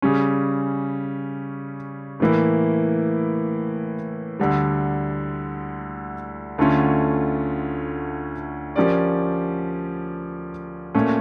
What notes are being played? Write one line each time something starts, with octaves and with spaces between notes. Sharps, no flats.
C#3 G3 C#4
A2 E3 A#3 E4
D2 D3 G3
D2 D3 A3 C#4 F4
F3 C#4 G4 A#4 D5
A#2 A3 C#4